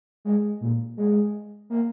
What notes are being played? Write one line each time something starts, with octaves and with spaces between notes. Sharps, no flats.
G#3
A#2
G#3
A#3